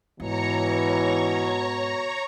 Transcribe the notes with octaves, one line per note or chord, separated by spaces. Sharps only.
G#2 B2 E3 C#5 A#5 C#6